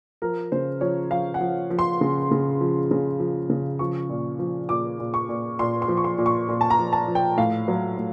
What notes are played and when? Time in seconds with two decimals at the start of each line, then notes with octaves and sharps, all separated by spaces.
0.22 F3 A#4
0.52 C#3 C5
0.81 F3 C#5
1.11 F3 F5
1.34 F#5
1.41 F3
1.70 F3
1.79 C6
2.01 C#3
2.31 C#3
2.61 F3
2.91 C#3
3.20 F3
3.50 C#3
3.79 F3 C#6
4.09 A#2
4.39 F3
4.69 A#2 D6
4.99 A#2
5.14 C#6
5.29 A#2
5.59 A#2 C6
5.82 C6
5.88 F3
5.97 C#6
6.04 C6
6.18 A#2
6.26 C#6
6.48 A#2
6.61 A5
6.70 A#5
6.78 F3
6.93 A5
7.08 F3
7.15 G5
7.37 A2 F5
7.68 F#3
7.98 A2